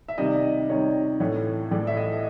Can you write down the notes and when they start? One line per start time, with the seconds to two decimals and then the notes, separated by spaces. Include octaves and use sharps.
0.08 E5
0.18 C3 D#3 G3 D#5
0.69 C3 D#3 G3 C#5
1.20 A2 E3 A3 C#5
1.71 A2 E3 A3 D5
1.87 E5
1.97 D#5